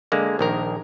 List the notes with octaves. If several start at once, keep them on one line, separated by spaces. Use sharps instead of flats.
D3 G#3 A#3
A#1 D#3 A#4